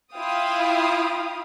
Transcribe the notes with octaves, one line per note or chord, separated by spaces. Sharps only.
E4 F4 F5 G5 D#6